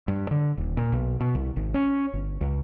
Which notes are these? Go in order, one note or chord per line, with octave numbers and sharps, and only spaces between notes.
G2
D3
D#1
A#2
B1
B2
C2
G#1
C#4
G1
C#2